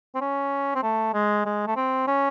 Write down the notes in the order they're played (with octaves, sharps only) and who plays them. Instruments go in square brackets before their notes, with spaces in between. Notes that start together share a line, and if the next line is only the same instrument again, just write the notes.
[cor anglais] C4
C#4
C4
A3
G#3
G#3
A3
C4
C#4